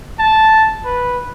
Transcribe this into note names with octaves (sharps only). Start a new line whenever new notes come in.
A5
B4